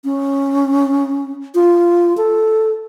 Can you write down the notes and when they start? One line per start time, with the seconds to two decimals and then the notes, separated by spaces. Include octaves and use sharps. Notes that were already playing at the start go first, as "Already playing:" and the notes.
0.04 C#4
1.55 F4
2.17 A4